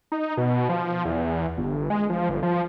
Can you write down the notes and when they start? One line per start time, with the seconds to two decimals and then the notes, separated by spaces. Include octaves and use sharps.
0.12 D#4
0.37 B2
0.69 F3
1.05 E2
1.57 G1
1.90 G#3
2.10 F3
2.29 G1
2.43 F3